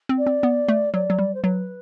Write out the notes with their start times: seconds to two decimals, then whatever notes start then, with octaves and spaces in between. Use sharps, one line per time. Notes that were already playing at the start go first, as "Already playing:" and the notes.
0.09 C4
0.18 D5
0.27 C4
0.43 B3
0.68 A3
0.93 F#3 D5
1.10 F#3
1.19 G3
1.34 C5
1.43 F#3 B4